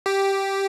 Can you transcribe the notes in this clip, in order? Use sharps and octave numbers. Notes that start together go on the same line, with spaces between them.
G4